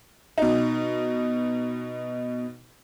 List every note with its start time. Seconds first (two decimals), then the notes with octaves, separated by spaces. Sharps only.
0.38 B2 D#4